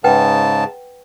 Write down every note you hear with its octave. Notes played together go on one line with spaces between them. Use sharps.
G#2 C#3 B4 F#5 G5 A5